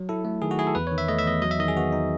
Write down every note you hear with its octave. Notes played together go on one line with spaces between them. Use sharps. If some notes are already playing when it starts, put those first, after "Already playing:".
Already playing: F#3
E4 A4
A3
D#3 G#4
F#4
E4 G#4
A4
E2 B4
D#3 C#5
E5
A3 D#5
E5
E2 D#5
F#3 D#5
E5
D#3 D#5
G#4
B3 F#4
D#4